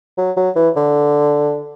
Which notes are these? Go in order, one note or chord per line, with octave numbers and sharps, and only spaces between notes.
F#3
F#3
E3
D3